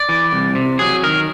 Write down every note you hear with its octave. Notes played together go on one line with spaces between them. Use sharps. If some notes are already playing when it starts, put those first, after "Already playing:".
Already playing: D5
E3
C2
C3
F#3 G#4
D#3 A#4